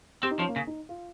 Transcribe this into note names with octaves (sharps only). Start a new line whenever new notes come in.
C4 G4
D#4
F3 C#4
A#3
C#3
D#4
F4